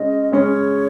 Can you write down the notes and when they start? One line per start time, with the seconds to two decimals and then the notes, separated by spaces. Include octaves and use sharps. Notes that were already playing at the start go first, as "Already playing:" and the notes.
Already playing: C#3 G#3 C#4 D#5
0.32 C#3 G#3 C#4 C#5